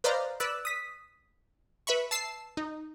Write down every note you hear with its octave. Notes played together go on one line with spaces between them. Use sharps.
B4 C5 D5 D#5 F5 A#5
B4 D5 E6 F#6
D#6 B6
B4 E5 B5 C#6
A5 E6 C7 E7
D#4